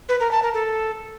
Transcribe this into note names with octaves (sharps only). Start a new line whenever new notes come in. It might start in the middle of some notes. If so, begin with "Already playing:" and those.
B4
A#4
A5
A#4
A4